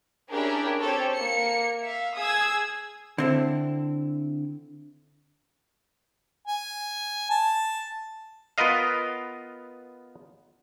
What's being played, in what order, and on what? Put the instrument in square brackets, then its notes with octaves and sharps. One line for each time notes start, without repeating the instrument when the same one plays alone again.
[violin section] C#4 D4 E4 G4 G#4 A#4
C4 G4 A4 C#5
A#3 C#7
E5 F5
G#4 D#6 E6 G#6
[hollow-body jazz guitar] D3 C4 E4
[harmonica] G#5
A5
[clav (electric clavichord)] B3 F4 A#4 B4 D#5 F5